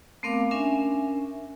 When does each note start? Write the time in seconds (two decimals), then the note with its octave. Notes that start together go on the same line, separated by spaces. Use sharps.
0.23 A3 B3 C4 A#4 F5 D6
0.51 C#4 D4 A#4 E5 G#5